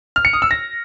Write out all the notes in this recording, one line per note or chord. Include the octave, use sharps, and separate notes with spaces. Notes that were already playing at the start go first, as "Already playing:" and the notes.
F6
C#7
D#6
E6
A#6